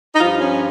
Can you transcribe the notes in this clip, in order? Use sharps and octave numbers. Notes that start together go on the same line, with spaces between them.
D#4
G2 F3 F4
C#4